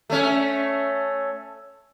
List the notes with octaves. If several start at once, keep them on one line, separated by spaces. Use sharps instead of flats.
A3 C#4